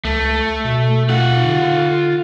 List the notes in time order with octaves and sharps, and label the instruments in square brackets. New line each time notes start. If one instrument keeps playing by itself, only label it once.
[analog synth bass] C#2 [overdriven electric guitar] A3
[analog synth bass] B2
[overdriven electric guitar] F4 F#5
[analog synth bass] D3